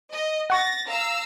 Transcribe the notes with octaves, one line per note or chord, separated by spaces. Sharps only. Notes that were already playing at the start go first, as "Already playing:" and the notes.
D#5
F#5 C#6 A6 A#6
F5 A#5 E6